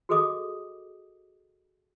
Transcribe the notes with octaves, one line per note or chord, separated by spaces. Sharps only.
F#4 G#4 A4 D#5 D6 D#6